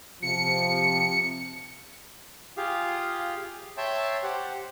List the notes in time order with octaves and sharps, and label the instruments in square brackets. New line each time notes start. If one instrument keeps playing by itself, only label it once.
[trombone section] C3 F3 [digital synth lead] C#7
[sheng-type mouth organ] F4 G4 G#4 F5
C#5 E5 G5 A5 C6
G4 C5 F#5